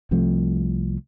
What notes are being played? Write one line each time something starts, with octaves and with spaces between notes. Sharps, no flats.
C2 C3 F3 A3